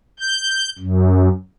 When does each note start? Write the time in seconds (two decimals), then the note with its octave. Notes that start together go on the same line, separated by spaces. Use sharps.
0.20 G6
0.79 F#2